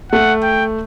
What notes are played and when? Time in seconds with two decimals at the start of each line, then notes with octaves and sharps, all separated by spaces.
0.12 A3 F#5
0.43 G5